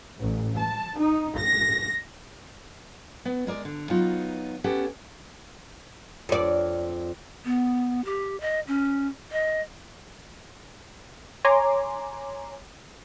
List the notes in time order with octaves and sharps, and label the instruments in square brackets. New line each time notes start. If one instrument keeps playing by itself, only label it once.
[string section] A1
A5
D#4
A#6
[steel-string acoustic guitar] B3
G#3 A#4 D5
D3
F#3 B3 D#4 F4
B3 C#4 G4 A4 F#5
[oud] F2 D5
[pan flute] B3
G4
D#5
C#4
D#5
[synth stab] C#5 G#5 A#5 C6 D6